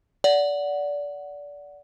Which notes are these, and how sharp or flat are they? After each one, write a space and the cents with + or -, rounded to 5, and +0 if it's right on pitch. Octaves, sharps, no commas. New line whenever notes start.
D5 -20 F#5 +0